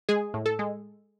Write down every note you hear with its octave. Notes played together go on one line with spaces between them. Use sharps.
G#3 G#4
A2
A4
G#3